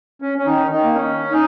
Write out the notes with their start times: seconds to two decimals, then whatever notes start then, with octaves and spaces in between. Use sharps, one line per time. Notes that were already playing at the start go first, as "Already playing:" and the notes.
0.22 C#4
0.38 C#4
0.46 D#3 D#4
0.70 D#3 D#4
0.83 A#3
0.95 C#4
1.32 D#4